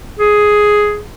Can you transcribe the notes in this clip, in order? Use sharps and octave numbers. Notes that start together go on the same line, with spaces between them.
G#4